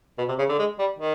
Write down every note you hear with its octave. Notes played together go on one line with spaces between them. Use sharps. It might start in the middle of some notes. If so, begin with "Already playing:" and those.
B2
C3
C#3
D3
G#3
G3
D#3